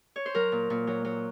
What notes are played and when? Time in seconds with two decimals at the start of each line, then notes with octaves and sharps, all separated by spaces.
0.16 C#5
0.26 C5
0.35 F#3 A#4
0.52 A#2
0.70 A#2
0.87 F#3
1.05 F#3